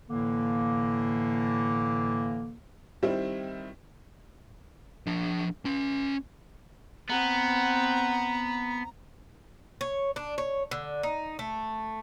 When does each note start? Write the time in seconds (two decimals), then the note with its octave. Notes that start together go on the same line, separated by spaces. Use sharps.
0.09 A2 D3 E3 A#3
3.03 D#3 G3 C4 E4
5.07 F3 D4
5.65 C#4 C6
7.10 B3 C4 F#5 A#5
9.81 C#5
10.16 D4
10.38 C#5
10.71 D3
11.03 D#4
11.39 A3